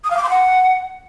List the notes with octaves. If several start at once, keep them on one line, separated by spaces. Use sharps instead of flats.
D#6
F5
D6
C6
F#5